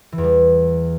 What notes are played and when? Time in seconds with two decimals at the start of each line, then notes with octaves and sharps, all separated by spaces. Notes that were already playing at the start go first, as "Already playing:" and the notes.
0.12 E3
0.18 E2
0.24 G3